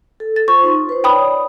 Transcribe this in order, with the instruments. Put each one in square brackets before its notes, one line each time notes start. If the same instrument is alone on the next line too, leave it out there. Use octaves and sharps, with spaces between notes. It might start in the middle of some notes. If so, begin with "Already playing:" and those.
[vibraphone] A4
[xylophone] A6
[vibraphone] F4 C5 [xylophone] C#6
[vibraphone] D#4 F4 C6
B4 C5
[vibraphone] C#5 D5 [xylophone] G5 B5 D#6